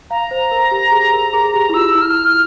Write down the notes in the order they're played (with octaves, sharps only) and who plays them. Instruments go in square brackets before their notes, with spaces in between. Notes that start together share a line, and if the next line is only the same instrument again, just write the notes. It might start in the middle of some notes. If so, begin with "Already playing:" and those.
[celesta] F5 [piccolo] A#5
[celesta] C5
A#4
G4
G#4
A#4
G#4
G4
E4
[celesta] F4 [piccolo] E6
[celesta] E4
[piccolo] F6
F6